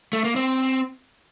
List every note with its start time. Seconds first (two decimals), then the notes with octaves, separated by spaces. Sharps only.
0.13 A3
0.24 A#3
0.36 C4